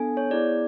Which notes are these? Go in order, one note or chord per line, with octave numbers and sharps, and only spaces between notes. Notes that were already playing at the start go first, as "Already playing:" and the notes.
Already playing: B3 D4 A4 G#5
C#5
B3 E4 G#4 D5